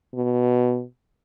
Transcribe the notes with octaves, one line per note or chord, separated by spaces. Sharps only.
B2